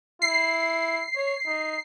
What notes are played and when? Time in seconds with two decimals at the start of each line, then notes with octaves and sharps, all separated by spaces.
0.22 E4 C7
1.16 C#5
1.46 D#4